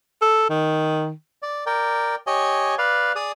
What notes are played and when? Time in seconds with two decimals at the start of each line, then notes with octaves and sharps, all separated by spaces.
0.21 A4
0.50 D#3
1.42 D5
1.66 A#4 D5 G5
2.27 G4 C#5 D#5 G#5
2.78 B4 D5 F5
3.16 G#4 D5 D#6